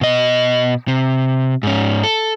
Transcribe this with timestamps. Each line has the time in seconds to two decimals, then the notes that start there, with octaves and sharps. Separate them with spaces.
0.01 B2 D#5
0.88 C3
1.63 G#2 C#4
2.03 A4